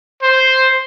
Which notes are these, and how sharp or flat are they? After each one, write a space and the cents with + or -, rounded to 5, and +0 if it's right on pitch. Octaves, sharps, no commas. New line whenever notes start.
C5 +0